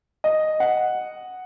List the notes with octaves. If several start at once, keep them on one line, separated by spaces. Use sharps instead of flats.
D#5
F#5